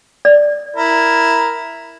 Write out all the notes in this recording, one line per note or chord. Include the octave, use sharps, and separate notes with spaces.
D5
E4 A#4